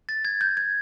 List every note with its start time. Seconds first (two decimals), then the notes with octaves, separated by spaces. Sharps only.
0.09 A6
0.25 G#6
0.41 G6
0.57 G#6